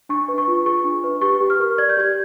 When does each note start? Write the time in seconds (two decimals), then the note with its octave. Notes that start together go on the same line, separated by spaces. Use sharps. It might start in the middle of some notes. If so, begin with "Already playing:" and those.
0.09 D4 C#6
0.28 B4
0.38 C#6
0.48 F4
0.65 G#4 C#6
0.84 D4
1.04 B4
1.21 G4 C#6
1.41 G4
1.50 F6
1.60 A#4
1.78 D5 G#6
1.89 G6
1.97 G4 G#6